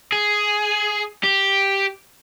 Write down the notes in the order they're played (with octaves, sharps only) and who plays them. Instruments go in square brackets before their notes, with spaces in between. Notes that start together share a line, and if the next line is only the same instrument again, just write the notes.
[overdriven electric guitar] G#4
G4